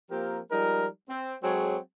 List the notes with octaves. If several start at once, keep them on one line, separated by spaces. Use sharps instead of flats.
F3 A#3 C4 G4 A#4
F3 G3 G#3 D#4 A#4
C4
F#3 G#3 C4 G#4 A4 C#5